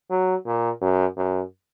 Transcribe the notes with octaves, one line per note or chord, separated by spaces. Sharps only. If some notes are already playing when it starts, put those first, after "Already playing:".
F#3
A#2
F#2
F#2